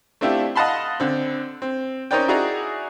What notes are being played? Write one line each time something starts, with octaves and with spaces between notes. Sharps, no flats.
A3 C4 D4 E4 F4 G4
D#5 F5 F#5 A5 B5 C6
D3 C4
C4
C#4 D#4 A#4 C5 D5 G5
D#4 E4 F#4 G#4 D5 A#5